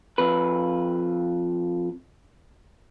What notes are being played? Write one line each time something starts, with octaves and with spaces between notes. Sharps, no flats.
F2 B4